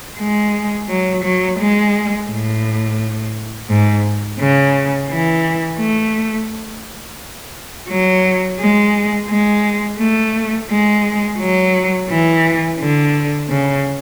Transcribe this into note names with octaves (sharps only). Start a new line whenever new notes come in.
G#3
F#3
F#3
G#3
A2
G#2
C#3
E3
A3
F#3
G#3
G#3
A3
G#3
F#3
E3
D3
C#3